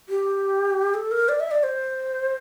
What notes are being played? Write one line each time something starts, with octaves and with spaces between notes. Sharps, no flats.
G4
A4
A#4
D5
E5
D5
C5